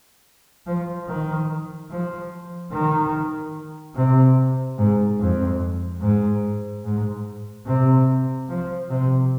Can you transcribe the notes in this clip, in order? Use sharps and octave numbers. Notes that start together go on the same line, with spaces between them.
F3
D#3
F3
D#3
C3
G#2
F2
G#2
G#2
C3
F3
C3